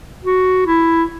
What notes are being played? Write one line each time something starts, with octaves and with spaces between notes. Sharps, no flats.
F#4
E4